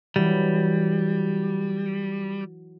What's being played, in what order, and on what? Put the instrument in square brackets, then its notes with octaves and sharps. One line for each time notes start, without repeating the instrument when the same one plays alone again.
[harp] E3 F#3 [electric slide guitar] G3